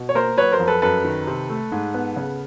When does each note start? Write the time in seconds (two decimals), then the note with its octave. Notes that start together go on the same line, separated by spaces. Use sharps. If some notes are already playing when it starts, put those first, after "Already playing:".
Already playing: B2
0.09 C#5
0.15 A#3 A#4 C5
0.37 F#3 B4 C#5
0.52 A#4 C5
0.60 F2
0.67 A4 B4
0.82 F#2 A4 B4
1.05 D#3
1.27 C3
1.50 A3
1.72 G#2
1.94 B3
2.16 C#3